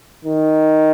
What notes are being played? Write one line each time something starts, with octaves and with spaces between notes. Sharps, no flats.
D#3